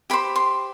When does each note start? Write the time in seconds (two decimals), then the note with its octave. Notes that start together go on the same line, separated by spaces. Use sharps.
0.10 G4 C5 B5
0.36 C6